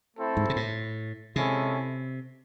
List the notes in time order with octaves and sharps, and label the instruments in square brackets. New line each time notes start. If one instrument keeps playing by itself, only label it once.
[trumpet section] A3 C4 E4 A4
[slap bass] G#2
C3
A2
[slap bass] C3 [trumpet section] G#3 C#4 E4 A4